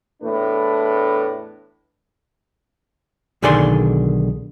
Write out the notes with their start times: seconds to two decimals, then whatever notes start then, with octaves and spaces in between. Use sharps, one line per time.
0.23 E2 A2 A3 D4 B4
3.42 B1 D3 D#3 G#4 D5 C6